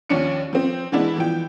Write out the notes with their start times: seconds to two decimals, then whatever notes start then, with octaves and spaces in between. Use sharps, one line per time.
0.09 D#2 F3 C#4 D4 C#7
0.53 F3 C4
0.92 E3 G#3 B3 D4 E4
1.16 E3 F3 G5